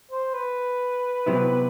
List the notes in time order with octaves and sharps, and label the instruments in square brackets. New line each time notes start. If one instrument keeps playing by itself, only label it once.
[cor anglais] C5
B4
[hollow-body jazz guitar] C3 F#3 B3 E4